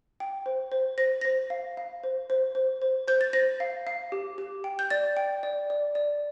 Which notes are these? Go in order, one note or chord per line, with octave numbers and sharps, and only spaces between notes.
G5
C5
C5
C5 A#6
C5 A#6
F5
F5
C5
C5
C5
C5
C5 G6
A6
C5 A#6
F5
F5
G4
G4
G5
G6
D5 A6
G5
D5
D5
D5